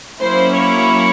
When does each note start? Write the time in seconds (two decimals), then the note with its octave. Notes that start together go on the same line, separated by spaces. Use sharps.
0.21 F#3 A#3 C#4 E4 C5
0.54 C#5